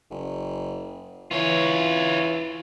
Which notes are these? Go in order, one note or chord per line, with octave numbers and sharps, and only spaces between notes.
F#1
E3 F4 C#5